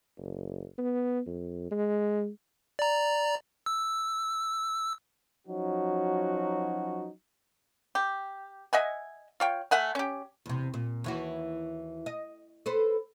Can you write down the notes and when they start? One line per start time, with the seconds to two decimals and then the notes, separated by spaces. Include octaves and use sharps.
0.18 F#1
0.78 B3
1.27 F2
1.71 G#3
2.79 D5 A#5
3.66 E6
5.47 F3 F#3 C#4 D#4 F#4
7.95 G4
8.73 D#5 E5 F#5 G#5
9.40 F4 C#5 G5
9.71 A3 E5 F#5 G#5
9.95 C#4 G4
10.46 E2 C3
10.74 A#2
11.04 D#2 E3 F#4
12.06 D#5
12.66 A4 B4 C5